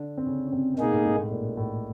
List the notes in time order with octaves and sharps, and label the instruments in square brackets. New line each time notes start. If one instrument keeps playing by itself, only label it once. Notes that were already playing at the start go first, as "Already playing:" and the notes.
Already playing: [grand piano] D3 D4
C4
C#3 C#4
C#4
C3 C4
C4
[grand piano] B2 B3 [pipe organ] A#3 D#4 G#4
[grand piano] A2 A3
G#2 G#3
A2 A3
A#2 A#3
A2 A3